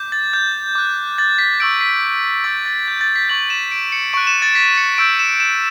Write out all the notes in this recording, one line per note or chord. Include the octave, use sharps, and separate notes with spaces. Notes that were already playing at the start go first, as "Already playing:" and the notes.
Already playing: D6 G6
A6
G6
D6 F#6
A6
B6
C#6 E6 G6 D7
B6
C#6 E6 G6 A6
A6
G6
A6
B6
C#6 G6 F#7
E7
D7
C#7
C#6 F#6 D7
E7
A6
B6
C#7
C#6 E6 G6 D7
E7
E7